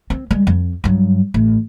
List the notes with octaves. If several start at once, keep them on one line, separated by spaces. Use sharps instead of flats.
C4
G3 G#3
F2
G2 F#3
A1